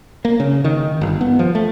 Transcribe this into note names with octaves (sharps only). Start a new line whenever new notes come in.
A#3
C#3
D#3
G1
B3
F3
A3